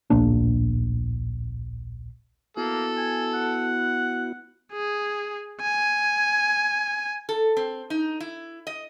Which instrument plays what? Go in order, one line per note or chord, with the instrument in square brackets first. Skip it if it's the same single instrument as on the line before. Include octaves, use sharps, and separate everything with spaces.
[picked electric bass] D1 A#1 A#3 D4
[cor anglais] A#3 [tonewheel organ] B3 E4 F#4 [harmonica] A4
[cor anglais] G#5
F#5
[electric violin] G#4
G#5
[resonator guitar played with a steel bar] A4
C4
D#4
E4
D#5